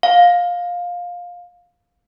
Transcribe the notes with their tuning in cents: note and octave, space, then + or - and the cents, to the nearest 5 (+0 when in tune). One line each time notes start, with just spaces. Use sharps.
F5 +15